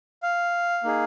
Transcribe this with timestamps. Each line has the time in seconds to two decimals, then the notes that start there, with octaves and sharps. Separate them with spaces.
0.23 F5
0.84 A#3 D#4 G#4